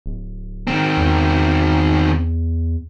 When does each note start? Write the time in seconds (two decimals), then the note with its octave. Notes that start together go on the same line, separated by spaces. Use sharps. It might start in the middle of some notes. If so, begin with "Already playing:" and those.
0.06 D1
0.67 D#3 C4
0.97 E2